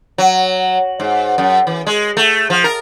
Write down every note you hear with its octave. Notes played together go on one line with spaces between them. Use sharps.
F#3
G#2
F#2
E3
G#3
A3
F3
A#4